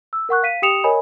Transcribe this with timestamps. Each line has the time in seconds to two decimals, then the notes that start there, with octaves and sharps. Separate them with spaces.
0.13 E6
0.29 A#4 F#5 C#6 F#6
0.43 F5 B6 D#7
0.62 G4 G5 D#6 C#7 E7 F7
0.84 A#4 C#5 D#5 G#5 B5